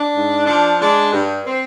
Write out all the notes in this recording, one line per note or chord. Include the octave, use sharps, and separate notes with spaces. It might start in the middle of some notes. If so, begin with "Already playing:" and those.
Already playing: D4
G#2
F3 D4
G#3 D4
G2
C4